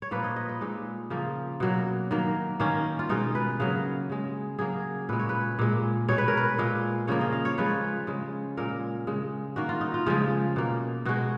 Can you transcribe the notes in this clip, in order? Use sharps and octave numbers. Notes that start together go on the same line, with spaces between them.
C#5
A#2 F3 A#3 B4
D#5
D#5
B4
A#2 G#3 D#4
C#3 F3 A#3
B2 F#3 A#3
D#3 F#3 A#3
D#3 A#3 C#4
F4
B2 G#3 D#4
B4
C#3 F#3 A#3 F5
C#3 G#3
C#3 F#3 A#3 G#4
A#2 G#3 B4
C#5
B4
A#2 G#3
B2 G#3 C#5
B4
A#4
B4
A#2 G#3
C#3 F3 A#3 C#5
D#5
F5
C#5
C#3 F3 G#3 B4
C#3 G#3
A#2 G#3 A#4
C#3 G#3
D#3 A#3 F#4
F4
D#4
F4
C#3 F3 G#3
B2 A#3
B2 G#3 F#4